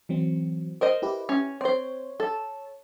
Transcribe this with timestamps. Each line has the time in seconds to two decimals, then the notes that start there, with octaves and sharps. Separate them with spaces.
0.09 E3 F#3 C4
0.81 A#4 C5 D#5
1.02 E4 G4 B4
1.29 C#4
1.61 C4 C5 C#5
2.20 A4